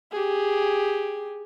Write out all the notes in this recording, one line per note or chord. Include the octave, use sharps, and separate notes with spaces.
G4 G#4